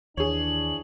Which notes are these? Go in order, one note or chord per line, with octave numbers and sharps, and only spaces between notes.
D#2 E3 D4 G#4 C#5 F#7